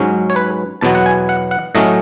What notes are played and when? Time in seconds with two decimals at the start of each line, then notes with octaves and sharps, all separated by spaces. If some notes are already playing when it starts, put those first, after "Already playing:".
Already playing: G#2 F#3 C#4
0.30 C#5
0.36 B4
0.81 E2 B2 F#3 B3 A5
0.95 F#5
1.06 G#5
1.29 F#5
1.51 F#5
1.75 A2 F#3 A3 C#4 D#5